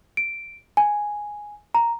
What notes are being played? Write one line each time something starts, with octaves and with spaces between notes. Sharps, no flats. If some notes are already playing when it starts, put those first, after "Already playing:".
D7
G#5
A#5